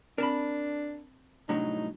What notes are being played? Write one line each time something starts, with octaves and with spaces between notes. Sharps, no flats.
C4 D4 A#4 A5 B5
C2 A2 F#3 D4 D#4